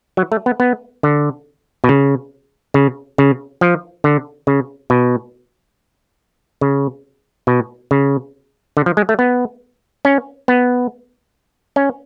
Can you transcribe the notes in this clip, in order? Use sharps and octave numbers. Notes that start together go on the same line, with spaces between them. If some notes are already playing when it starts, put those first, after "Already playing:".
F#3
A3
B3
B3
D3
B2
C#3
C#3
C#3
F3
D3
C#3
B2
C#3
B2
C#3
D3
F3
G#3
A3
B3
C#4
B3
C#4